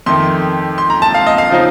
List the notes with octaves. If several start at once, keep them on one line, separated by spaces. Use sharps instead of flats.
F2 D#3 A3 C6
C6
A#5
A5
F5
D#5
F5
C#3 F3 C4 D#4